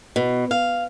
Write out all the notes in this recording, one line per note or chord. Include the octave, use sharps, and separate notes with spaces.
B2
F5